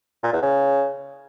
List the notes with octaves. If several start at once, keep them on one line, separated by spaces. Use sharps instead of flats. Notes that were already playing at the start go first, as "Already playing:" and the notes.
A#2
E2
C#3